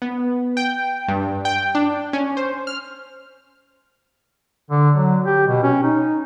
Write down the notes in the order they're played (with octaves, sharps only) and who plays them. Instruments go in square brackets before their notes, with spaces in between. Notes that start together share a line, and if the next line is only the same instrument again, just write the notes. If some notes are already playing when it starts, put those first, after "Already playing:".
[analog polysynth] B3
G5
G2
G5
D4
C#4
C5
F6
[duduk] D3
F#3
G4
B2
C#4
D#4